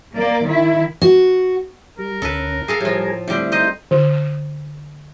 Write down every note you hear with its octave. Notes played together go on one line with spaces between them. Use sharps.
A#3 D5
D#3 E4
F#4
G3 A#4
D2 D3 C#4 A4 B4
G#4 A4 F5
A2 F3 G3 A4 G#5
D3 G3 A3 C4 E4
D#4 C5 D#5
D3